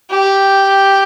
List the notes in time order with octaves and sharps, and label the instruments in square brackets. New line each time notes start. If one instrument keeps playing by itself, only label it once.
[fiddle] G4